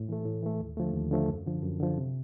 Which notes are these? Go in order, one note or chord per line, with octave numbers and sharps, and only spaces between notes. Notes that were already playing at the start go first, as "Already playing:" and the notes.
Already playing: A2
E3 A3
A2
E3 A3
D#2
D3 F3 A3
D#2
D3 F3 A3
F#2
D3 F3
F#2
D3 F3
C3